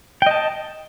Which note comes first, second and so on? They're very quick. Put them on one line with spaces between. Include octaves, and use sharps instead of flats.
G5 D#5 A5